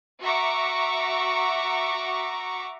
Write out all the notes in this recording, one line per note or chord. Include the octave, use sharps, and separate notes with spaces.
F#4 E5 A#5 C#6 D6